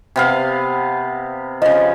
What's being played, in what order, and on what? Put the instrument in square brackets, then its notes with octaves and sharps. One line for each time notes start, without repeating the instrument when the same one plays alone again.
[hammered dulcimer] C3 B3 F5
[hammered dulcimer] C#3 F3 [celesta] D#5